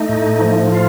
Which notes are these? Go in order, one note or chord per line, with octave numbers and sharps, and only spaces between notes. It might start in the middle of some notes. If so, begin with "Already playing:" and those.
Already playing: A3 D#4
A2
F3
F4